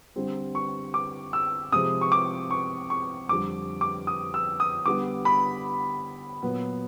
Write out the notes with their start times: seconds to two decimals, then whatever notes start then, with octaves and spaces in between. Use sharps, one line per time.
0.16 D3 G3 C4
0.55 C#6
0.94 D6
1.33 E6
1.72 C3 F3 G#3 C4 D#6
2.01 C#6
2.12 D6
2.51 C#6
2.90 C#6
3.29 F2 D3 G3 D6
3.81 D6
4.07 D#6
4.34 E6
4.60 D#6
4.86 D3 G3 B3 D6
5.25 B5
6.43 A#2 F#3 B3